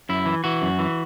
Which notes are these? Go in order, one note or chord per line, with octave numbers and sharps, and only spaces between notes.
F#2 E4
E3
E3 F#4
F#2
E3